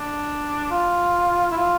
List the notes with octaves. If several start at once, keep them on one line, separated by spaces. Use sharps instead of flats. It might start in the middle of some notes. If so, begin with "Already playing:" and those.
Already playing: D4
F4
E4
F4